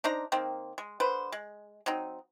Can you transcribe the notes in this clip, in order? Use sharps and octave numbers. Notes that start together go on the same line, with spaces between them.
D4 D#4 C5 A#5
D#3 A#3 C4
G#3
D3 B4 C5
G#3
F#3 C4 D#4